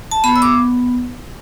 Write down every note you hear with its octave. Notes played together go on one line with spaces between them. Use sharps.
A5
B3 B5
E6
D6